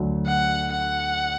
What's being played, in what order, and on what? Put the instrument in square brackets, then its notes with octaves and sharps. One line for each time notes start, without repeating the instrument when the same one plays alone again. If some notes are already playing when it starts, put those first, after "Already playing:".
Already playing: [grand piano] D2 D3 F#3
[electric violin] F#5
F#5